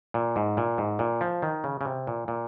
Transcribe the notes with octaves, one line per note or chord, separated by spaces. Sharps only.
A#2
G#2
A#2
G#2
A#2
F3
D#3
C#3
C#3
C3
A#2
A#2